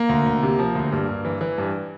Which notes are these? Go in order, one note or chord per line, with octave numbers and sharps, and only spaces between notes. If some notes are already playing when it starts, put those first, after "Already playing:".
Already playing: A#3
D2
D2
C3
F3
D2
G2
G2
E3
E3
G2